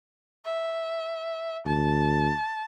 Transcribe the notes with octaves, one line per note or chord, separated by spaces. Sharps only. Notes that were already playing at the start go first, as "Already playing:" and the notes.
E5
D2 A5